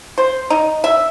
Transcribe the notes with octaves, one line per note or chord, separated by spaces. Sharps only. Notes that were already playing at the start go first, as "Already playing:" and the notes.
C5
D#4
E5